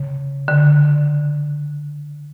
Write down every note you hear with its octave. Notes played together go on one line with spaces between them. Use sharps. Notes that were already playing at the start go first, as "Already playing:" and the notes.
Already playing: C#3
D3